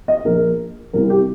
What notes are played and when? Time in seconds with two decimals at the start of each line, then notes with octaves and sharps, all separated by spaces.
0.08 D#5
0.25 A#1 A#2 F3 A#4
0.93 C2 C3 G3 A#4
1.10 G4